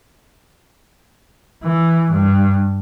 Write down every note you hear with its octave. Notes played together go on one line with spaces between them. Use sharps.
E3
G2